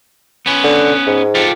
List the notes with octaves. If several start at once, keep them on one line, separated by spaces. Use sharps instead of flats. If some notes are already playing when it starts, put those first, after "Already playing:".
B3 C#4 B4
D3
G#2
F4 G4 A4